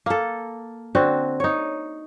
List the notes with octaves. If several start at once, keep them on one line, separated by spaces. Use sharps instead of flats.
A#3 A4
D3 C4 F#4
D#4 C#5